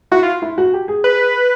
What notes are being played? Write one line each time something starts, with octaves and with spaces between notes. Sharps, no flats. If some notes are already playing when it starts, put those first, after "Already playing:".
E4 F#4
F4
E4
F#4
G4
G#4
B4